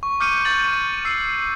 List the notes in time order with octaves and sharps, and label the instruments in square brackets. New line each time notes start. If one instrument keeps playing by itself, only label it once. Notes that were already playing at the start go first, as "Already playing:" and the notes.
[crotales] C#6
D6 F6 G6 C#7 D#7
C#6 G6 A6 F#7
E6 C7